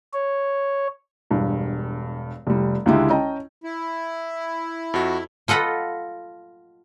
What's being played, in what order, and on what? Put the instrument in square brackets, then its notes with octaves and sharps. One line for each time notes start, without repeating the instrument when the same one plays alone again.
[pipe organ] C#5
[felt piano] E1 G2
F1 G3
C#2 D3 G#3 E4 G4
C#4 D#5 G5 A5 A#5
[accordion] E4
[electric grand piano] F2 F#4
[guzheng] F4 A4 D#5 F#5 B5